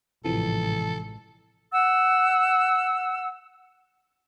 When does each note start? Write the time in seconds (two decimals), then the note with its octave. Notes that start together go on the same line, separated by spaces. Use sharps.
0.25 A1 G#2 C3 E3 F3 A4
1.72 F#5 E6